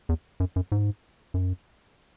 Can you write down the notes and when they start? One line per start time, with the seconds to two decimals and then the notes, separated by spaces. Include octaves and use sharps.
0.09 E2
0.40 F#2
0.56 F#2
0.72 G#2
1.34 F#2